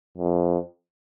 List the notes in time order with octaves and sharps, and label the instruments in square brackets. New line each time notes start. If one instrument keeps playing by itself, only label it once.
[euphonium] F2